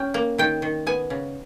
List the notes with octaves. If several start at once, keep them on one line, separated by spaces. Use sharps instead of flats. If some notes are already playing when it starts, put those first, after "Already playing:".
Already playing: C#4 G5
A#3
D#3 G5
D#3
B3 G#5
C#3